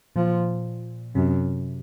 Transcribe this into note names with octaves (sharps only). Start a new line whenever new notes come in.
A#2 F3
F#2 C3